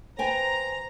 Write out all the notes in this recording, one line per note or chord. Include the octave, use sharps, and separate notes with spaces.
B4 C5 G5 G#5 A#5